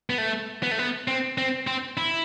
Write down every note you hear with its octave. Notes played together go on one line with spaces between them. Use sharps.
B3
A3
B3
A3
B3
C4
C4
C4
E4